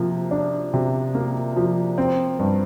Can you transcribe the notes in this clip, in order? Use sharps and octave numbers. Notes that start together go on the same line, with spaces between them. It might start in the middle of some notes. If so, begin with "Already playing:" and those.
Already playing: C3 F3 A#3
D4
C3
A#3
F3
C4
G2